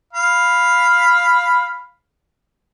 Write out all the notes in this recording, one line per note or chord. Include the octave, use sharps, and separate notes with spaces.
F5 B5